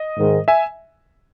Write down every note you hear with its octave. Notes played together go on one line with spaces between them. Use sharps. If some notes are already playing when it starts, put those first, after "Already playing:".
Already playing: D#5
G#2 D#3 G#3
E5 G#5